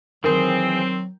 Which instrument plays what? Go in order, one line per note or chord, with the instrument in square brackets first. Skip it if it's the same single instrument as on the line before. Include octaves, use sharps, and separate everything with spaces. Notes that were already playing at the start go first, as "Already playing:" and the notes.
[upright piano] D#3 [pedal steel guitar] E3 G#4 [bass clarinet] F#3 [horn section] C4